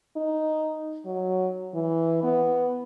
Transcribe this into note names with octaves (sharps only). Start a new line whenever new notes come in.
D#4
F#3
E3
B3